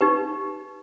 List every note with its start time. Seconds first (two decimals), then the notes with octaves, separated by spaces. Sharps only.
0.01 D#4 G4 B4